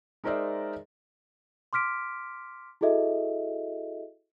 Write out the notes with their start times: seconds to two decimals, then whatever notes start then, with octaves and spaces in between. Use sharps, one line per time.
0.24 G#3 D#4 A#4 C5 D5 E5
1.73 C6 D6 F6 B6 D7
2.81 E4 F#4 G#4 A4 D#5 E5